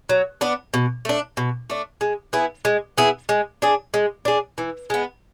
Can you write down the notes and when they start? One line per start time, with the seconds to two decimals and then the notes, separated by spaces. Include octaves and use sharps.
0.09 F#3
0.41 B3 D4
0.74 B2
1.05 A3 D4
1.37 B2
1.70 A3 D4
2.01 G#3
2.33 B3 E4 G#4
2.65 G#3
2.97 B3 E4 G#4
3.29 G#3
3.62 D4 G#4
3.94 G#3
4.25 D4 G#4
4.58 E3
4.90 G#3 B3